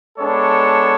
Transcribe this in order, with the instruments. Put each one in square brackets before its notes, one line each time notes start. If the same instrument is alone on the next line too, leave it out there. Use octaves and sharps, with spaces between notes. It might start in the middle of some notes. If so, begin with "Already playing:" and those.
[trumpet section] G#3 B3 D4 A4 C#5